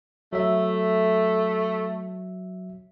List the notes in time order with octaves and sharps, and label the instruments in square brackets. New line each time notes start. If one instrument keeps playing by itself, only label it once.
[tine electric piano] F#3 E5 [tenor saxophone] A3